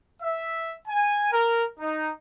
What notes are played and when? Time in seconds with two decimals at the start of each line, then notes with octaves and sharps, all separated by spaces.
0.21 E5
0.88 G#5
1.32 A#4
1.80 D#4